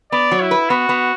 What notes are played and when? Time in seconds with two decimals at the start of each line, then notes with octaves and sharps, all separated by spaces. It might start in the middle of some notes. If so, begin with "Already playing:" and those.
0.12 B3 D5
0.31 F#3
0.41 E4
0.51 B4
0.70 B3 F#4
0.89 B3